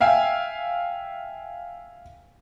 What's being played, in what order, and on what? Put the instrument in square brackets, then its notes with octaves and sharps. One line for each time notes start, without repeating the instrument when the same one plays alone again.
[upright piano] E5 F5 G5 G#5